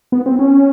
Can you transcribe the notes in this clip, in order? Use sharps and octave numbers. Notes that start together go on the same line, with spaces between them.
B3
C4
C#4